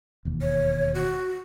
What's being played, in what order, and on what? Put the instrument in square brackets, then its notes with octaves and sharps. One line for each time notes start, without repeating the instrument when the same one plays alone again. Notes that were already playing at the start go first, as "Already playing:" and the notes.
[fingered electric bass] E1 D#2
[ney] C#5
F#4